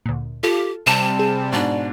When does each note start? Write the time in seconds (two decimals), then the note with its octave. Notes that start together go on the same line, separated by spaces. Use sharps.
0.06 D2 A#2
0.43 F4 G4 A4
0.87 C3 G3 A5
1.19 G#4
1.52 G#2 B2 D4 D5